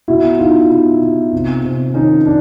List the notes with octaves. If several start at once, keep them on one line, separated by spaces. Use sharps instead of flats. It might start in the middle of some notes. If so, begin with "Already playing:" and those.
B2 E4 F#4
B2 D#4 F4
B2
B2
C3
C3
D#3 C#4 D#4
D4